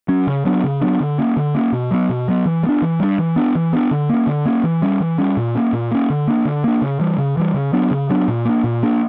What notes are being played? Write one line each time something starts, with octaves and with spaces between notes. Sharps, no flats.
F#3 C#4
C#3
F#3 B3 D4
C#3
F#3 B3 D4
D3
A#3 C#4
D3
A#3 C#4
B2
F#3 B3
B2
F#3 B3
E3
G3
B3 D4
E3
G3 B3 D4
E3
B3 D4
E3
B3 D4
D3
A#3 C#4
D3
A#3 C#4
E3
G3 C#4
E3
G3 C#4
A#2
A#3 C#4
A#2
A#3 C#4
D3
A#3 D4
D3
A#3 D4
C#3
E3 G3
C#3
E3 G3
C#3
F#3 B3 D4
C#3
F#3 B3 D4
A#2
A#3 D4
A#2
A#3 D4